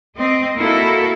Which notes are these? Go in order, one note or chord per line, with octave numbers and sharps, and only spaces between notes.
C4 D#5
A#3 E4 F#4 A4